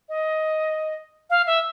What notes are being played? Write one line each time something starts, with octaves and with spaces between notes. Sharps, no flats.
D#5
F5
E5